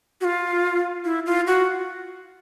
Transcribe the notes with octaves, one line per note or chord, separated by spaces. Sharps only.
F#4
F4
E4
F4
F#4